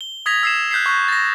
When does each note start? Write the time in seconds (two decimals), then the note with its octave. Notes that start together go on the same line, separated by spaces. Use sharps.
0.01 G7
0.26 D#6 G#6 A#6 B6 F7
0.43 E6 C7 E7
0.71 F#6 G6 B6 C7
0.86 C#6 F#6 G6
1.08 A6 A#6